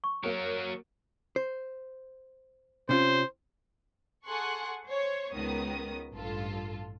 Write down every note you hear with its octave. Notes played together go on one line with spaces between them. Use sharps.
C#6
F#3 A#3 F#4 A#4 C#5
C5
C3 C#4 F4 C5
G#4 A4 F#5 C6 C#6 F#6
C5 C#5
C#2 D#3 B3 D#6
A1 G2 F4 A4